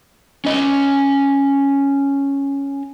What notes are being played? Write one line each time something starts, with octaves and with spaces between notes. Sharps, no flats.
C#4 D#5